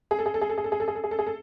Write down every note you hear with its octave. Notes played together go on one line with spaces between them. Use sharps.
G#4
A4
G#4
A4
G#4
A4
G#4
A4
G#4
A4
G#4
A4
G#4
A4
G#4
A4